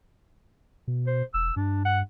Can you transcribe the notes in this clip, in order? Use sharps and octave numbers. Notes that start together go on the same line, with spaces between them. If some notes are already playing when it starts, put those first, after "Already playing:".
B2
C5
E1 E6
G2 D4
F#5